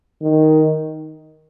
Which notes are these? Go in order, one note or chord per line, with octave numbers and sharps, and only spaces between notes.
D#3